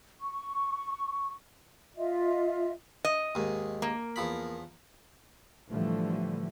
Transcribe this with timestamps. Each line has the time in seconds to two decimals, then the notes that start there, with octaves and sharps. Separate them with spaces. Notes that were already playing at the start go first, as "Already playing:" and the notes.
0.20 C#6
1.95 F4 D#5 E5
3.05 D#5
3.35 D#2 G#2
3.82 A#3
4.16 E2 F3 B5
5.69 A2 D3 E3 F3 G3 A3